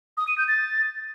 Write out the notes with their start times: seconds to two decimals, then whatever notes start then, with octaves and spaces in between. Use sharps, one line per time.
0.17 D#6
0.28 D#7
0.38 G6
0.48 A6